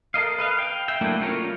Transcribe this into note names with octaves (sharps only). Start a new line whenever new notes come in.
A4 A#4 D#5 F5
B4 D#5 F5
F5 G5
E5 G5
F#3 A3 A#3 D4 E4
G3 C#4 F4 A#4 C#5